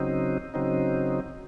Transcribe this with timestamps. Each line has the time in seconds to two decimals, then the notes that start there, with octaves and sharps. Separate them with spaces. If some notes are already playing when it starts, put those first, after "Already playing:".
Already playing: C#3 F#3 C4 D#4
0.54 C#3 F#3 C4 D#4